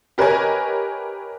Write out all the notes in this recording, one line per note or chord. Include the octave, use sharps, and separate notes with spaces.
G4 A#4 B4 C#5 D#5 G#5